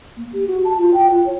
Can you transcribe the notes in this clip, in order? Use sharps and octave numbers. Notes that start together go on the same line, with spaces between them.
A#3
G4
F#4
A5
F4
G5
F4
C#5